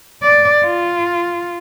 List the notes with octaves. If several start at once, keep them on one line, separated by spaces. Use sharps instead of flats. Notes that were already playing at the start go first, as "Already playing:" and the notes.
D5
F4